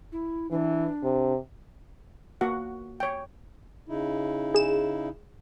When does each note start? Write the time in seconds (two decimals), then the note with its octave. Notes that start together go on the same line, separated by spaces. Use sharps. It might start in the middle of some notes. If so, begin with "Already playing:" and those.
0.12 E4
0.51 E3 D4
1.03 C3
2.41 A#3 F#4 F#5
3.00 C#5 G5
3.89 C#3 D#4 E4
4.54 G#4 E7